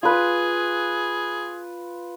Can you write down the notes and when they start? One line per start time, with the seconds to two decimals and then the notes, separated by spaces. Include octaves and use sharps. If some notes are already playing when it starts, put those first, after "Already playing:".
0.03 F4 G#4 B4